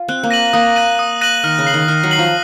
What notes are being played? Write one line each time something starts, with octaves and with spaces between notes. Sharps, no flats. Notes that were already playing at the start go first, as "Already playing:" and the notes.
Already playing: F4
C4 F#6
A#3
A#6 D#7 F#7
A#3 D#6
F#6 A#6 D#7 F#7
D#6
F#6 A#6 D#7 F#7
D#3 F6
C#3
C7 F#7
D#3
D#3 F6
F#3
C7 F#7
F3